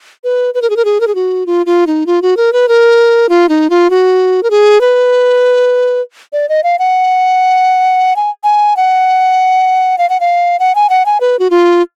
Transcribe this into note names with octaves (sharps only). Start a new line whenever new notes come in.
B4
B4
A#4
G#4
A#4
G#4
A#4
G#4
F#4
F4
F4
D#4
F4
F#4
A#4
B4
A#4
F4
D#4
F4
F#4
A#4
G#4
B4
D5
D#5
F5
F#5
G#5
G#5
F#5
F5
F#5
F5
F#5
G#5
F#5
G#5
B4
F#4
F4